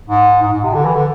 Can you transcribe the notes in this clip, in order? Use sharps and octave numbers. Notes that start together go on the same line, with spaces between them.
G#2
G#2
G#2
C3
D3
E3
D3